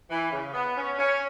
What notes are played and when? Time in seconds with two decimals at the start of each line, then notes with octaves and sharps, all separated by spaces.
0.10 E3
0.32 C#3
0.54 B3
0.76 C#4
0.98 C#4